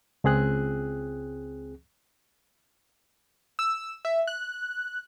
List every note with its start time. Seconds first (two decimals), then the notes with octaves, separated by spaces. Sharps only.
0.24 C#2 C4 G#4 F#6
3.59 E6
4.05 E5
4.27 F#6